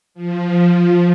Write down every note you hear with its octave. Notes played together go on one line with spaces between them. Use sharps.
F3